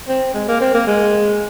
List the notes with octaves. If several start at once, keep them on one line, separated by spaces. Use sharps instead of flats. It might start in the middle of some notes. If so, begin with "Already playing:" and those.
C4
G#3
A#3
C4
A#3
G#3